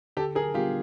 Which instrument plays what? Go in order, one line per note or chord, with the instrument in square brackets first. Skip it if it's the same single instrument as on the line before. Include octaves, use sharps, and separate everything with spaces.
[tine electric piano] D3 [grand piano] G4 A4
[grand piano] G#4 A#4
[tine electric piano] G3 B3 D4 [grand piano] F4 G4